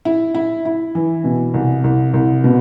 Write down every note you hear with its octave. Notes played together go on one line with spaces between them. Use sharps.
E4
E4
E4
E3
B2
C2
C2
C2
B2